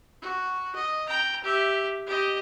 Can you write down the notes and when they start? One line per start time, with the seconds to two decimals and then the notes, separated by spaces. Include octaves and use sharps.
0.22 F#4
0.75 D#5
1.07 G5 A#5
1.44 G4 E5
2.06 G4 D#5